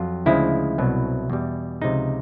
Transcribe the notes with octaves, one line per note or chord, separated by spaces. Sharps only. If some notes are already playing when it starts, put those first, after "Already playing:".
Already playing: F2 F#3 F4
D2 C#3 F3 G#3 E4
C2 B2 F#3
E2 B2 G3
C#2 C3 F3 G#3 D#4